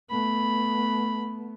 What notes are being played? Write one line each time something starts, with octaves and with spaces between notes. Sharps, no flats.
A3 B3 B5